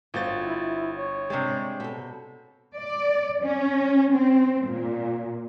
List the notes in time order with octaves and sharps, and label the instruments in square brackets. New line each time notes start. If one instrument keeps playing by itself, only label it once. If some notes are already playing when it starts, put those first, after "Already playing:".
[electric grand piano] G1 A6 [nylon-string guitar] F4 F#4 C5
[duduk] E4
C#5
[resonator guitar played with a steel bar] C3 G3 [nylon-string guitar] G#3 C4 D4
[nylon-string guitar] B2 A4
[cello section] D5
C#4
C4
A#2